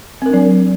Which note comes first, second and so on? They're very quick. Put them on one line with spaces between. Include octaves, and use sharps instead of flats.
C4 A#4 D4 F#3